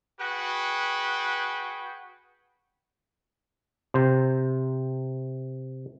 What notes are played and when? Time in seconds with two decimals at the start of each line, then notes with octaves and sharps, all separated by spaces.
0.20 F#4 G#4 B4 F#5 G5
3.94 C3 C5